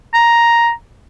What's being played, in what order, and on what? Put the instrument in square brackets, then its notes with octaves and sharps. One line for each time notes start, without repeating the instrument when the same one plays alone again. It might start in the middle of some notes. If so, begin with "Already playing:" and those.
[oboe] A#5